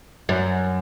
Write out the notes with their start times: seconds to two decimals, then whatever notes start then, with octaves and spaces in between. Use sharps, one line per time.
0.29 F#2